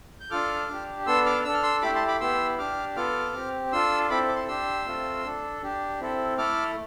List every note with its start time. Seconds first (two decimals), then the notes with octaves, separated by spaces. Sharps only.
0.20 G6
0.31 D4 F4 A4 D6 F6
0.69 D4 G4
1.07 B3 D4 A4 C6 E6
1.26 D6 F6
1.45 D4 A4 E6
1.54 F6
1.63 C6 E6
1.82 A3 E4 G4 B5 D6
1.95 A5 C6
2.08 B5 D6
2.21 B3 E4 G4 C6 E6
2.58 D4 G4 D6 F6
2.96 B3 F4 A4 D6 F6
3.34 C4 G4
3.72 D4 F4 A4 C6 E6
4.10 C4 E4 A4 B5 D6
4.28 D6
4.36 A5 C6
4.48 D4 G4 C6 E6
4.86 A3 C4 F4 A4
5.24 D4 A4
5.62 D4 G4
6.00 C4 E4 A4
6.37 A3 E4 A4 D6 F6